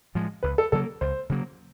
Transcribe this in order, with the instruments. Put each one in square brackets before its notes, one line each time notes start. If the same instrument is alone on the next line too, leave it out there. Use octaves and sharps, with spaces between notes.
[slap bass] A2 F3 G#3
[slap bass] C#2 [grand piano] B4
[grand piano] A4
[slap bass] C#3 F#3 A#3 [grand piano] A4
[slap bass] C#2 [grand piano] C5
[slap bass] C#3 F#3 A#3